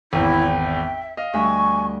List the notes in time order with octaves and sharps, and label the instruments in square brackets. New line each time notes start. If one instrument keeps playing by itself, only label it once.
[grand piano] G#1 E2 [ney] E4 [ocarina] G5
[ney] E5
[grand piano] D#5 [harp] F5
[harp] D2 G3 E5 [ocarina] G#5 [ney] C#6